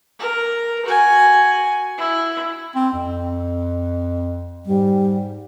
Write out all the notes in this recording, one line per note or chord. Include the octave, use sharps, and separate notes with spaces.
A#4
F#4 G#5
E4
C4
F2
G#2 G3